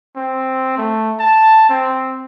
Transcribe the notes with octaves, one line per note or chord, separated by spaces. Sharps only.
C4
A3
A5
C4